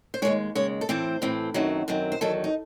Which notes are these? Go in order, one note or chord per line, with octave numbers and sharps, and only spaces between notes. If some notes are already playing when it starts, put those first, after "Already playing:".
C5
D#2 C#3 G#3 C#5
D#2 C#3 G#3 C#5
A4
A2 E3 C4 C5
A2 E3 C4
F#2 D#3 F#3 C4
F#2 D#3 F#3 C4
C5
E2 D#3 F#3 A4
D#4